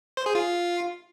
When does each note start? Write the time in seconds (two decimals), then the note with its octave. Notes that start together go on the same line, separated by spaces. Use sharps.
0.17 C5
0.26 G#4
0.35 F4